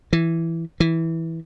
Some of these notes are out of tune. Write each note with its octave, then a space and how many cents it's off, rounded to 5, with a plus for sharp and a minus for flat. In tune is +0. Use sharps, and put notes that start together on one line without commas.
E3 +5
E3 -10